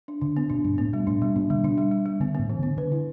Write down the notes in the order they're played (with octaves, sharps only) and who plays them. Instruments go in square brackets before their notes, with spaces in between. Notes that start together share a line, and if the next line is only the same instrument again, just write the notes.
[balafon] D4
[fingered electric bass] D3 [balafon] D4
[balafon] B3
[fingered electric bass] B2 [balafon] D4
[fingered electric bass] G2 [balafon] D4
[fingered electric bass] A2 [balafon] B3
[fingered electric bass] B2 [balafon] G3
[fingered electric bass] A2 [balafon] D4
[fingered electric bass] B2 [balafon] G3
[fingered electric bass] B2 [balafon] D4
[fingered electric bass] D3 [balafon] G3
[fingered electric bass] B2 [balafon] D4
[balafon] G3
G3
G3
[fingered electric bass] D3 [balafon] B3
[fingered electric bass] A2 [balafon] B3
[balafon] E3
[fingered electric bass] D3 [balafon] B3
[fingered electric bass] D3 [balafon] B4
[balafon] E4